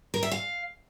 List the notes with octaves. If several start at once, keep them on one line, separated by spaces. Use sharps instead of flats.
A#4
E5
F5